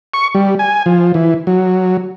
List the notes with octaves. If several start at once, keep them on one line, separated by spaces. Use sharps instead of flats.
C#6
G3
G#5
F3
E3
F#3